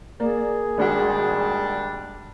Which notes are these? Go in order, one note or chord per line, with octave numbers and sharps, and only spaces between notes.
A#3 G#4 D5
G#1 G#2 G3 D4 F#4